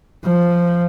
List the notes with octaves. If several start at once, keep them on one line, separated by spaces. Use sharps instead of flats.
F3